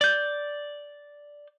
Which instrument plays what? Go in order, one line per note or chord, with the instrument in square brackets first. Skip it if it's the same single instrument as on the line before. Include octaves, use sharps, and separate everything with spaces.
[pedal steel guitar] D5 G6